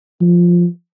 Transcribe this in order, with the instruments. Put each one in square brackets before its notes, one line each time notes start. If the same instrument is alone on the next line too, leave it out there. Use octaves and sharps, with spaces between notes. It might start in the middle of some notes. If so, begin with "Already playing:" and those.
[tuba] F3